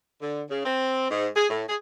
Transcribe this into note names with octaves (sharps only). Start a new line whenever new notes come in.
D3
C#3
C4
G#2
G#4
A2
G#4